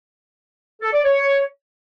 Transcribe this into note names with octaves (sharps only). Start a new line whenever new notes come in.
A4
D5
C#5